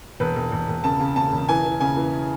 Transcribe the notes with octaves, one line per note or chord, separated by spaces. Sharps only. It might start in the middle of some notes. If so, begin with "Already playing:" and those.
E1 B4
E1
E1
E1
C#3 A5
C#3
C#3 A5
E1
E3 G#5
E3
C#3 G#5
E3